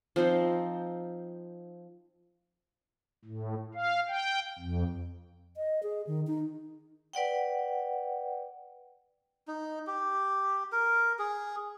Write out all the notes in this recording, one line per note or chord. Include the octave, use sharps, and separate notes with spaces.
F3 C4 D#4 C5
A2
F5
G5
F2
D#5
G#4
D#3
D#4
B4 D5 F#5 G5
D#4
G4
A#4
G#4